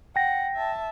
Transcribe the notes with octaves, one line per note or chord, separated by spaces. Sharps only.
F#5 G5 A#6
E5 A5